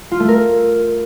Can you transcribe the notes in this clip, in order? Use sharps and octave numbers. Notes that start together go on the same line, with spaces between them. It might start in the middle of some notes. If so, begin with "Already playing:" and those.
F4
A3
A#4